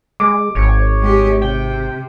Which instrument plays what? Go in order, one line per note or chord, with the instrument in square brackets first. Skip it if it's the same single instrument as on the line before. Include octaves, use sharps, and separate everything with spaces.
[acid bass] G#3 [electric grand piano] D6
[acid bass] G#1 [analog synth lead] C#5
[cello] G#3 G4
[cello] C3 [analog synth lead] G5